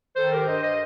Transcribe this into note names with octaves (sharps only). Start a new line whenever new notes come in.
D#3 A4 C5
G4 A#4
G2 C5 D#5
C5 D#5